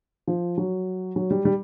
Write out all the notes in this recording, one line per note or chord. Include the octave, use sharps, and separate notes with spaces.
F3
F#3
F#3
G3
G3